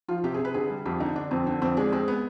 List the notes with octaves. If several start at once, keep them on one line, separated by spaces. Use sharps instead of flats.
F3 F4
C3 G4
G#4
C3
B4
D3 G#4
G3
F2 G4
D3 D#4
D3 D4
F2 C4
D3 C4
F2 C4
G#3 D4
G#3 C4
B3